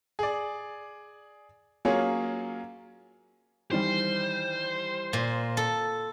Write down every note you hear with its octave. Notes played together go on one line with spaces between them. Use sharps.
G#4 D5
F#3 A#3 C#4 F4 G#4 C#5
D#3 E3 G3 C5
A#2
A4